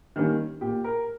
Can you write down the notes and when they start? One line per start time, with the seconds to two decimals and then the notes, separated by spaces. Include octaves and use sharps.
0.16 D#3 G3 A#3 C#4
0.61 A#2 G4
0.84 A#4